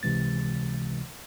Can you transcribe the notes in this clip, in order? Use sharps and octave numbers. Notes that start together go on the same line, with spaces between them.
C#2 C3 E3 G#3 A6